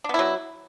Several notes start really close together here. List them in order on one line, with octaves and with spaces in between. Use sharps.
D4 B3 E4 F#3